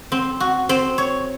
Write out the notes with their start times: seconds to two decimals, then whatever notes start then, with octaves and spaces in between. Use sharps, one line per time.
0.12 C4
0.40 F#4
0.69 C4
0.98 C#5